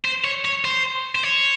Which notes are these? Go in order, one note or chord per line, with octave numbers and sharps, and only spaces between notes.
C5
C#5
C#5
C5
C5
C#5